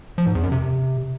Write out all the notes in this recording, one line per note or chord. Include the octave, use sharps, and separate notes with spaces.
F3
G#2
E2
F#2
C3